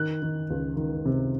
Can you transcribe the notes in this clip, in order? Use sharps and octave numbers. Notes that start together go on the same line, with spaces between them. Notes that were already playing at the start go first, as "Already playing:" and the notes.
Already playing: D#3 F#6
D#3
C#2
D#3
C3